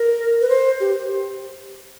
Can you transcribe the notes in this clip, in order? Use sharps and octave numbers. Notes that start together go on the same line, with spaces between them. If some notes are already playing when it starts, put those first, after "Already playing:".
Already playing: A#4
B4
C5
G4